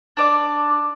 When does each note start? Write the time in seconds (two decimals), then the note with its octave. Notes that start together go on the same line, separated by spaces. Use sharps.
0.17 D4 D5 D6